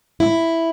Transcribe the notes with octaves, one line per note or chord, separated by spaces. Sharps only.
E4